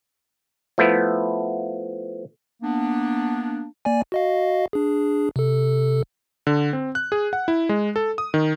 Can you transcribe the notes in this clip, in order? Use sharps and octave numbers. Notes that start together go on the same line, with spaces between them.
F3 A3 B3 E4
A#3 B3 D4
A#3 D5 G#5
F#4 D#5 F5
D4 G#4
C3 A4
D3
C4
F#6
G#4
F#5
E4
G#3
A4
D#6
D#3